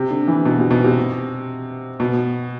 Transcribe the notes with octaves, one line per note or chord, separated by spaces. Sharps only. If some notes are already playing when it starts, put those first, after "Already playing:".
Already playing: C3
D3
E3
B2
C3
B2
C3
B2